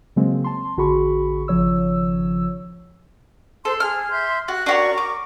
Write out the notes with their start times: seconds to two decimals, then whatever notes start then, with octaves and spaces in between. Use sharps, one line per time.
0.16 C#3 F#3 G#3 A#3 C4
0.44 A5 C6
0.77 A1 D3 F#4 G#4 B5 C#6
1.48 G#1 C#3 F3 C#5 E6
3.65 A4 C5 C6
3.80 G#4 F6
4.10 E5 C6 G6
4.48 F#4 F#6
4.66 D4 F#4 A#4 C#5 C#6
4.98 D6